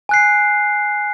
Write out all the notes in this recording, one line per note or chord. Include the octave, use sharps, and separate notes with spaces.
G#5 F#6 C7